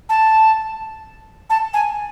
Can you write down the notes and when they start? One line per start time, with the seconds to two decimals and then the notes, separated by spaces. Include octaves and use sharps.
0.09 A5
1.50 A5
1.73 G#5